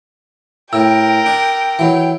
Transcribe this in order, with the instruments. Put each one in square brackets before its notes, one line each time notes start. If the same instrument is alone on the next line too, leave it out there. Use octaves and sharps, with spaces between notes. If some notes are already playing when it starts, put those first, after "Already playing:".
[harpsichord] A2 [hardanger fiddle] A#4 [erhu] G5 [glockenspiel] E6
[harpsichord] D4
E3 F#3